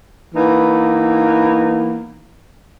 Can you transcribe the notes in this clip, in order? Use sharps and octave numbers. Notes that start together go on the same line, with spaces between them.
E3 A#3 B3 D#4